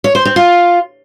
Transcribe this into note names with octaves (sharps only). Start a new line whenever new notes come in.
C#5
C5
C4
F4